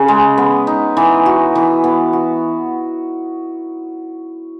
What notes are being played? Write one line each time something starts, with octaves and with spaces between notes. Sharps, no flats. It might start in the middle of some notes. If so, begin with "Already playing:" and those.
Already playing: C#3
G#3
B3
D#4
E3
F#4
E3
B3
F#4